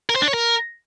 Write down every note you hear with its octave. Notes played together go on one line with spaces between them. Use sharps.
A#4
C5
D4
C#5
A#4